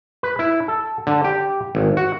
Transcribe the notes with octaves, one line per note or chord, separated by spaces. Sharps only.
B4
E4
A4
D3
G4
G#1
F#4